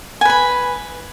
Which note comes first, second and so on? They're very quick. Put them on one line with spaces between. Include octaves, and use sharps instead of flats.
G#5 B4 B5